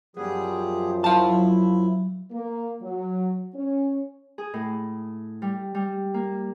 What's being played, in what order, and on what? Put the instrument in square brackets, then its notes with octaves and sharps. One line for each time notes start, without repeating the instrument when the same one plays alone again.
[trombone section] F#2 F3 [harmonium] G3 G#4 [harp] B3
[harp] F#3 [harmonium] E4 [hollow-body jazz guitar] F5 A5
[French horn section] A#3
F#3
C#4
[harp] G#4
A2
G3
G3
A#3